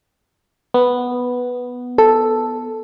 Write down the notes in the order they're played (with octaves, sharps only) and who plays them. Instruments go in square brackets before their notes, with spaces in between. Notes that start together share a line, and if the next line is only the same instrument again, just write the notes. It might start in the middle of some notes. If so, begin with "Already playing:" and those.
[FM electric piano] B3
[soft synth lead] A4